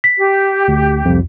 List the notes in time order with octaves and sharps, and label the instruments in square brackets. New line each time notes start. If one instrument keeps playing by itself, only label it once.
[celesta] B6
[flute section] G4
[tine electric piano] D2
C2 F2